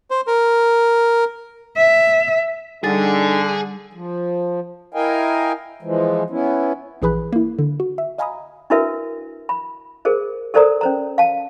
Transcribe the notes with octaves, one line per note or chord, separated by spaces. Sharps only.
C5
A#4
E5
D3 G3 D4 D#4 G#4 A4 A6
F3
E4 A#4 D#5 F5 G5 G#5
E3 F3 G#3
B3 C#4 E4
A#1 E3 G#4 B4 B5 F#6
A#3 E4
D3
F#4
E5
D#5 F5 G#5 A#5 B5 D#6
D4 E4 F#4 A#4 B4 E5
B5
G#4 A#4 C5
A4 A#4 C5 D5 A#5 D#6
C#4 C5 A#5
F5 A5